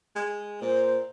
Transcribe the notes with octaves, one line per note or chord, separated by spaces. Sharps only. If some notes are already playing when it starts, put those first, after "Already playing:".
G#3
A#2 C5